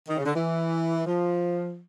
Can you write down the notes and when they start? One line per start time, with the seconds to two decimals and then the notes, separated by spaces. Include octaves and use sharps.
0.08 D#3
0.17 C#3
0.26 D3
0.35 E3
1.06 F3